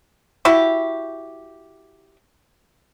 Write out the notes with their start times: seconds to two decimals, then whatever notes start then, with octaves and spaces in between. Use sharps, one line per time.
0.45 E4 F#4 G4